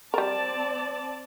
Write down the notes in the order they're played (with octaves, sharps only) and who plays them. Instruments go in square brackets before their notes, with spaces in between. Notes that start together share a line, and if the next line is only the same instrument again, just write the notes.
[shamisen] G3 A#4 [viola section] C4 D5 A5